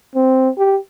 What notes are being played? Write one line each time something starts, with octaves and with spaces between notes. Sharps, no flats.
C4
G4